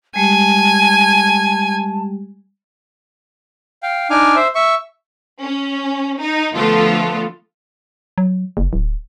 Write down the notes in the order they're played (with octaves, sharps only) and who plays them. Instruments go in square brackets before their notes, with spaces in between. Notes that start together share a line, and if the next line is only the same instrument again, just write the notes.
[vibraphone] G3 G#3 G4 [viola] G#5 [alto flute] A5
[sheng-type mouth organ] F5 G5
D4 D#4 G#5 D6 F6
C5 E5
E5 C#6
[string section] C#4
D#4
D3 F3 A3 B3 F4 A4
[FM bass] F#3
F#1
D1